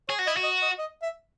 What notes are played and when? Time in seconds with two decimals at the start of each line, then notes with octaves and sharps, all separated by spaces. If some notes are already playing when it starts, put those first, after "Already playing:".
0.09 G#4 C#5
0.19 F#4
0.27 E4 D#5
0.37 F#4
0.43 D#5
0.62 D#5
0.78 D#5
1.02 E5